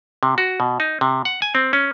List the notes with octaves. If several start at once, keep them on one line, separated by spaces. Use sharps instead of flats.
C3
F#4
B2
D#4
C3
F#5
G#5
C4
C#4